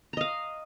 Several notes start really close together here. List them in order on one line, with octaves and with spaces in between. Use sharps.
A#5 D#5 F5